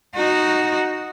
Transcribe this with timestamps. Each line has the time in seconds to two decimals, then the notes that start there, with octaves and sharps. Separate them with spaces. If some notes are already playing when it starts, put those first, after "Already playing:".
0.15 D#4 F#4